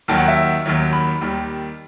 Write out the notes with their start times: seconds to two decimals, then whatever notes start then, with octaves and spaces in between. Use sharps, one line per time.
0.08 D#2 D#3 F#3 A5
0.18 F#5
0.28 E5
0.65 D#2 D#3 F#3
0.93 B5
1.21 D#2 D#3 G3